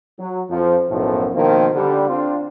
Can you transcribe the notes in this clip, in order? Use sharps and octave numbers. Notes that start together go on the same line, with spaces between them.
F#3
F2 F3
B1 F#2 A2 F3 B3
B2 D#3 F3 A#3 C4
D3 G3
C4 D4 F4